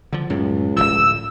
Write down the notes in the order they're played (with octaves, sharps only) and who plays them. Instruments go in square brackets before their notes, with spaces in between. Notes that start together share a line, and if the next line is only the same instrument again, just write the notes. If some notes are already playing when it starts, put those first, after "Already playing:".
[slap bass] D3 F3
[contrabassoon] C#2 [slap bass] F#2 A2
[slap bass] D1 B1 F3 [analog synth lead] E6